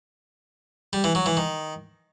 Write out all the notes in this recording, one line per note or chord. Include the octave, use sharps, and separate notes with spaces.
G3
E3
F#3
E3
D#3